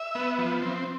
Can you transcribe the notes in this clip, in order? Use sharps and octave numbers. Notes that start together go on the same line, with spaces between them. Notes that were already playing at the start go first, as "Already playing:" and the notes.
Already playing: E5
B3
F3
C4